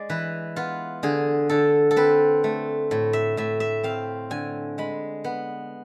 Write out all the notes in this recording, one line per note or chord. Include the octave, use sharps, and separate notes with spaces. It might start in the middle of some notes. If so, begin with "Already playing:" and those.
Already playing: G#3 D5
E3 B4
B3 F4
D3 G#4
D3 A4
A4
C4 B4
A3
A2
E5
A2 E5
E5
C4 F5
D3 G#5
G#3 B5
B3